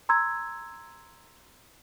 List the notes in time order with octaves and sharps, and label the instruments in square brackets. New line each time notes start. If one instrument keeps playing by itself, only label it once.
[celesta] A#5 C6 E6 G#6